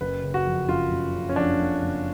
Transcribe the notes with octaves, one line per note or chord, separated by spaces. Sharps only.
F#1 B4
C#3
F#4
F2
F#1 F4
F#1
C#3
C#4
F2 D4
F#1
F#1